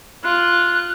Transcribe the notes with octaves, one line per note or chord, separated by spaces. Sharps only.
F4 F#6